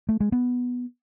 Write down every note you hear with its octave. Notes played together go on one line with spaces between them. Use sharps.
A3
G#3
B3